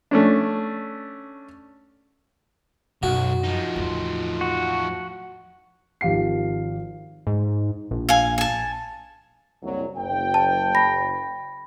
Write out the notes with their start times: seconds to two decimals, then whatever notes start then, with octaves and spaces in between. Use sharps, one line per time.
0.11 A3 C#4 D4
3.03 B1 F#2 F#4
3.44 F3 D#4
3.76 E2 A2
4.41 F#4
6.01 G#1 F3 G4 F5 C7
7.27 G#2
7.91 A#1
8.09 F5 G#5
8.38 G#5 A5
9.63 F#1 C2 F#3
9.97 F#1 G5
10.34 A5
10.75 B5 A#6